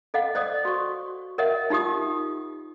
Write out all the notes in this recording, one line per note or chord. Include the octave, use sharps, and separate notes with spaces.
A4 D#5 F5 F#5
C5 D5 D#5 D#6
F#4 C#6
A#4 C#5 D#5 E5 F#5
D#4 F4 G4 C#6 D#6